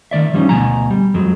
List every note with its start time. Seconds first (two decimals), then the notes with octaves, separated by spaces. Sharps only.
0.11 D#3 F3 D5 E5
0.34 F3 G3 G#3 C#4 D#4
0.49 D2 B2 G#5 A#5
0.91 G3
1.14 F2 F#3 G#3